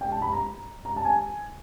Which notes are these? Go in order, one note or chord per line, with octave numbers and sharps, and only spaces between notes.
G5
A5
B5
A#5
A#5
A5
G#5